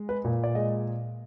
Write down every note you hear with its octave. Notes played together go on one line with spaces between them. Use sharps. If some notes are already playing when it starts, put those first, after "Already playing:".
Already playing: G#3
B4
A#2
D5
G#3 D#5